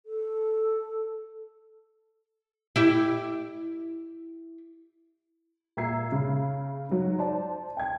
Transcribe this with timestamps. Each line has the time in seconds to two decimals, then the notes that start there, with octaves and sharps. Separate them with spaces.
0.06 A4
2.76 E4 G4
5.77 A#2 E5 A#5 E6 G#6 C7
6.12 C#3
6.89 G#2 F#3
7.18 C5 D5 A5
7.77 G5 G#6